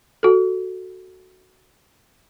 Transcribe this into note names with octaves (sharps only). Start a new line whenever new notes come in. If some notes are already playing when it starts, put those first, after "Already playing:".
F#4 A4